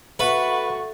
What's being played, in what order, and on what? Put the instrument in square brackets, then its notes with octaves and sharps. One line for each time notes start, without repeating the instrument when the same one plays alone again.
[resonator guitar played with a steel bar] A3 [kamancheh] F#4 C#6 [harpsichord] B4